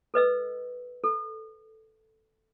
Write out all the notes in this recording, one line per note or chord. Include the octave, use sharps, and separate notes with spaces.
A4 B4 D#5 E6
A4